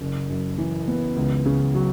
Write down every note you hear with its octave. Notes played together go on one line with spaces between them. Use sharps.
F#1
F#2
E3
B3
C#2
C#3
F#3